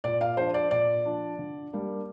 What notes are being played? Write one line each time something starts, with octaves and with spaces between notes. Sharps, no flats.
A#2 D5
F5
F3 D4 C5
D5
A#2 D5
F3 D4
D3
G3 A#3 D4